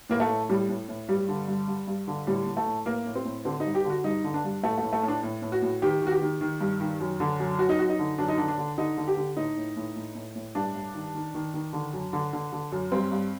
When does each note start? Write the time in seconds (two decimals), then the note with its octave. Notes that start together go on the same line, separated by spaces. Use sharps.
0.09 A2 A#3
0.20 A3
0.30 A2
0.49 A2 G3
0.69 A2
0.89 A2
1.09 G2 G3
1.28 D3
1.48 G2
1.67 G2
1.87 G2
2.07 D3
2.27 A2 G3
2.47 A2
2.57 A3
2.66 A2
2.86 A2 A#3
3.06 A2
3.15 C4
3.25 A2
3.45 D3 C4
3.60 D#4
3.65 G2
3.75 G4
3.85 D3
3.90 F#4
4.04 G2 D#4
4.24 D3
4.34 D4
4.44 G2
4.63 A2 A3
4.78 A2 A3
4.93 A3
5.03 A2
5.08 D4
5.23 A2
5.42 A2
5.52 F#4
5.62 A2
5.82 D#3 G4
6.02 D#3
6.07 F#4
6.11 G4
6.22 D#3
6.41 D#3
6.61 G2
6.80 D#3
7.00 F#2
7.20 D3
7.40 F#2
7.59 F#2 F#4
7.69 D#4
7.79 F#2 F#4
7.89 D#4
7.99 D3
8.18 F#2 D4
8.28 D#4
8.38 D3 D4
8.48 D4
8.58 D3
8.78 D3 D#4
8.97 D3
9.07 G4
9.17 D3
9.37 A2 D#4
9.57 A2
9.76 A2
9.96 A2
10.15 A2
10.36 A2
10.55 G2 D4
10.75 G2
10.94 D#3
11.15 D#3
11.34 D#3
11.54 D#3
11.73 D3
11.93 F#2
12.13 D3
12.33 D3
12.52 D3
12.72 F#2
12.92 G2 C4
13.12 G2